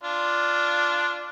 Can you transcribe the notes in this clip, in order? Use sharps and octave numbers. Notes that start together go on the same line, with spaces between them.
D4 F4